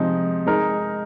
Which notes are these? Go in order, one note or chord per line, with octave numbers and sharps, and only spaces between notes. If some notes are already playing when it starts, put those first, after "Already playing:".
Already playing: C3 F3 G#3 C4 D#4
G#3 D#4 A#4